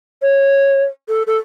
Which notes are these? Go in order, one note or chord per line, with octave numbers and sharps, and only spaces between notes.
C#5
A4
A4